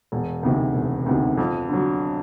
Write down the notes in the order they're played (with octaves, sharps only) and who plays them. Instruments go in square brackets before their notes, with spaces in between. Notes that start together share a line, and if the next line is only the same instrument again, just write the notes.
[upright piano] E1
D2 C3 D#3
E1
D2 C3 D#3
F2
D3 F#3